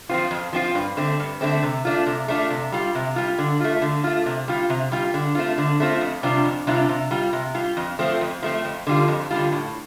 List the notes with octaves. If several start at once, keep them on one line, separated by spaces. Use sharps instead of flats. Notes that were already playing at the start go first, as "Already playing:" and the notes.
F3 C4 F4
F2
F3 C4 F4
G2
D3 A3 C4
G2
D3 A3 C4
C3
A3 D4 F4
C3
A3 D4 F4
C3
G3 F4
C3
G3 F4
D3
A3 F4
D3
A3 F4
C3
G3 F4
C3
G3 F4
D3
A3 C4 F4
D3
A3 C4 F4
F2
C3 G3 D4 F4
F2
C3 G3 D4 F4
C3
G3 F4
C3
G3 F4
F2
F3 A3 C4
F2
F3 A3 C4
F2
D3 G3 F4
F2
D3 G3 F4
A2